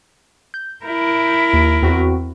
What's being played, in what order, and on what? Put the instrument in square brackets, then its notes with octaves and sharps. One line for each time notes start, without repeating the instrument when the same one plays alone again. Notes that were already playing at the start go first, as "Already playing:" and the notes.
[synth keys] G6
[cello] E4 A#4
[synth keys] D#2
E2 C4 F#4